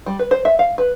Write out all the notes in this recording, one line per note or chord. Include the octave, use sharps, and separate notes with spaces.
G3
B4
C5
E5
F5
B4